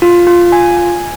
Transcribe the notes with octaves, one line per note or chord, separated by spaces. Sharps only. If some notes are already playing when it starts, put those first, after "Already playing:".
F4
F4
G#5
G#5